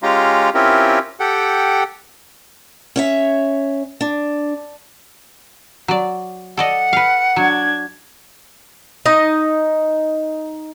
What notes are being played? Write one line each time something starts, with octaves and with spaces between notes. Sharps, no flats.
G#3 C#4 F4 G4 F5 A#5
C4 C#4 E4 F4 G4 A#4
G4 A4 F#5 G5
C#4 C#5 E5
D4
F#3 D5
A4 D5 D#5 F#5
B4 F5
F#3 D4 G#6
D#4 D#5